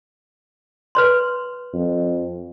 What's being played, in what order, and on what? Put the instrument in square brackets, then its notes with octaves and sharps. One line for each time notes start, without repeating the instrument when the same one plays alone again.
[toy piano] B4 C#5 C6
[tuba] F2